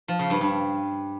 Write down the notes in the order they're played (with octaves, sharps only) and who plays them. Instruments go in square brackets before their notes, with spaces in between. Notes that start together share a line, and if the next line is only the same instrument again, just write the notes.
[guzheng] F3
C#3
G2
G2